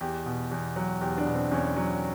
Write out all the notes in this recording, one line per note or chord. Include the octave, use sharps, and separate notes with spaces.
E2 G4
B2
E2
F#3
E2 G4
D4
B2
C4
E2 C#4
F#3